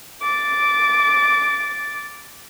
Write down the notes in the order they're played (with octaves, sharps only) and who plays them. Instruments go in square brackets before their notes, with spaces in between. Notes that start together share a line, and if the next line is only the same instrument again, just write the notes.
[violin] D6 A6